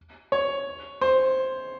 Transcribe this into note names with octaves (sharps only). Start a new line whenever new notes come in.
C#5
C5